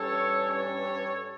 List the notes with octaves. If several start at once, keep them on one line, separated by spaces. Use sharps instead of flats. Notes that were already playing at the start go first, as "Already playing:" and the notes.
Already playing: G2 E3 G3 C#4 A4 C#5
A4 C#5